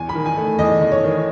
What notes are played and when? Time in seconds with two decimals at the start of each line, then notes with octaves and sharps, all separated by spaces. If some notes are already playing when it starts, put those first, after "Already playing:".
Already playing: E2 G#5
0.09 B5
0.15 D#3
0.26 G#5
0.37 A3
0.59 E2 D#5
0.81 E2
0.92 C#5
1.03 D#3